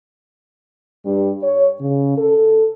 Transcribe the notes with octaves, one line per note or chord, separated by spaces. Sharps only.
G2
C#5
C#3
A4